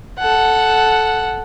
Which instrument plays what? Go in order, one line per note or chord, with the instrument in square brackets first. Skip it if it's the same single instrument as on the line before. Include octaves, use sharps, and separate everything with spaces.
[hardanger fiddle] A4 F#5